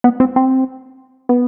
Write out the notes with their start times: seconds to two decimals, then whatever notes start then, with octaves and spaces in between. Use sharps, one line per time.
0.04 B3
0.20 C4
0.36 C4
1.29 B3